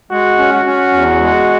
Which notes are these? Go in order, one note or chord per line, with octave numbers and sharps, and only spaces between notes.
G#3 F#4
C#4
F#4
C#4
E2
G#3